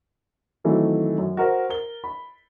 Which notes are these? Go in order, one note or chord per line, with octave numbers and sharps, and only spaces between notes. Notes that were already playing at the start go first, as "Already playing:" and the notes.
D#3 E3 F#3 A3 C4
F#2
F#4 A#4 C5
A#4 G7
B5